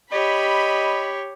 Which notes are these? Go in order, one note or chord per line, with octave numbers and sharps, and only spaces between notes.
G4 C#5 D#5 B5